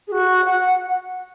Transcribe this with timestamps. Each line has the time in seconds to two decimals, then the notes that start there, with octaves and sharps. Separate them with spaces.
0.07 G#4
0.11 F#4
0.44 F#5